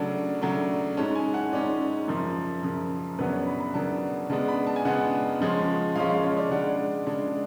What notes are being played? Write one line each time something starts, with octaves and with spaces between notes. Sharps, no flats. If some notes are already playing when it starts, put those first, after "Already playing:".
Already playing: C#3 F#3 A3 D4 A5
C#3 F#3 A3 D4
G#2 G#3 C#4 A5
G#5
F#5
G#2 G#3 C#4 D5
F#2 C#3 F3
F#2 C#3 F3
F#2 C#3 F#3 B3 D4 B4
C#5
B5
B5
F#2 C#3 F#3 B3 D4 A5
C#3 G#3 B3 D4 A5
B5
A5
G#5
C#3 G#3 B3 D4 F#5
C#3 F3 G#3 C#4
C#3 F3 G#3 C#4 F5
F5
C#5
D5
C#3 G#3 D4 F#5
C#3 G#3 D4 A5